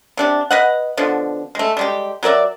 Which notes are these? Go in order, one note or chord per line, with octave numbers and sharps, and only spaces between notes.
C3 D4 G4
B4 D#5 F#5
B2 D3 F3
G#3 A3
G3 G#3 G4
F#3 A#4 D5 E5